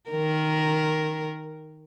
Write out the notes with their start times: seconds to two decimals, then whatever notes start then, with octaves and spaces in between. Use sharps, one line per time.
0.10 D#3 A#4